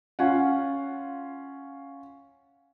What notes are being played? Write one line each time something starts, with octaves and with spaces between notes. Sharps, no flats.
C#4 F4 F5 F#5